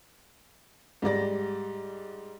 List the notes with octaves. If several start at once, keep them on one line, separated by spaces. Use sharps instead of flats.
G#2 G3 D5 A#6